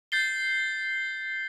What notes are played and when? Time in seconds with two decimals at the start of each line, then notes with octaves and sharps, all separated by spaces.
0.12 G6 A6 C7 G7